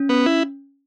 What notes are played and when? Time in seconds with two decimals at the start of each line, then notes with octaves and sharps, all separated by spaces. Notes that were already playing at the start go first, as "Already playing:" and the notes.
Already playing: C#4
0.09 B3
0.26 E4